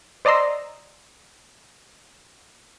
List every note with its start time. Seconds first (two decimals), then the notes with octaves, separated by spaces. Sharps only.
0.25 C5 D5 D#5 A#5 C6 E6